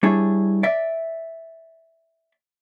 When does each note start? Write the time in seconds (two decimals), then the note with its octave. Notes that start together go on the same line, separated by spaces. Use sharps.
0.03 G3 D4 E4 G#4 C#5
0.63 D5 E5